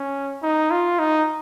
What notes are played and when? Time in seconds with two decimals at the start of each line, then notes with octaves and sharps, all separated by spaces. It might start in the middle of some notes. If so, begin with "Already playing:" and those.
Already playing: C#4
0.43 D#4
0.71 F4
0.99 D#4